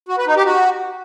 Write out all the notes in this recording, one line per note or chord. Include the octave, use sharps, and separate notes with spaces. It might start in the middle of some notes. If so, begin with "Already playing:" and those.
F#4
B4
D#4
G4
F#4